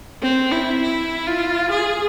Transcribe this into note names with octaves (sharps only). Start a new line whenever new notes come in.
C4
E4
E4
F4
G#4